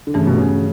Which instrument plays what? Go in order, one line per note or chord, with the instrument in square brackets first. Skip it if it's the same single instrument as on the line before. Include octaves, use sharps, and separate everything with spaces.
[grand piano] D3
[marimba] G2 E3 A3 [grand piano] C#3
[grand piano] B2
C#3